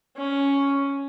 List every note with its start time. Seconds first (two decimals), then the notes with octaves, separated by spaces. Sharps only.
0.17 C#4